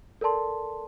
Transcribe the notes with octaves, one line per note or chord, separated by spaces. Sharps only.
A4 A#4 D5 A5 C6